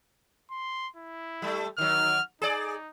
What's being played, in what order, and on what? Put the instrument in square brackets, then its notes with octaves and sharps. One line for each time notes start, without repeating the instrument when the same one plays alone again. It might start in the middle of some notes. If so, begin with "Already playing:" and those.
[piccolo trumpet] C6
E4
[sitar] G3 A3
[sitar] D#3 F#3 [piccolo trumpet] F6
[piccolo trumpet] D#4 [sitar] G#4 D5